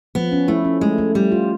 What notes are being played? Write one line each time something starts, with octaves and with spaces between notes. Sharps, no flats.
F3 B3
C#4
A3 E4
C#4
G#3 A3
A3
G3 A3
F4